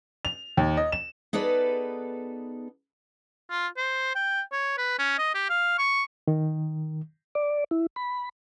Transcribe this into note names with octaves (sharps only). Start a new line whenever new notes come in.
F7
D#2
D#5
E7
B3 D#4 G#4 A4 B4 D5
F4
C5
G5
C#5
B4
C#4
D#5
G4
F5
C#6
D#3
D5
E4
B5